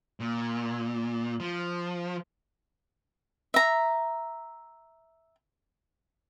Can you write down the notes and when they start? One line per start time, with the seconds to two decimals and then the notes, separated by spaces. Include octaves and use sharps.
0.20 A#2
1.40 F3
3.54 E5 A#5